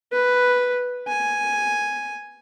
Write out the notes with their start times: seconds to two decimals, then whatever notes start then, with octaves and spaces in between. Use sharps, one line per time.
0.13 B4
1.08 G#5